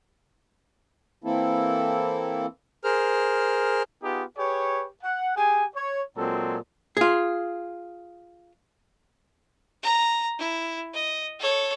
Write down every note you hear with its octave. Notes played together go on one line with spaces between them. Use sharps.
E3 A#3 C4 E4 A4
G#4 A#4 C5 F6
B3 D#4 F4 G4 G#4
G4 G#4 B4 C#5
F#5
G4 G#4 G#5
C#5
A#2 F#3 G#3 C4 A4
F4 G#4
A#5
E4
D#5
A4 C#5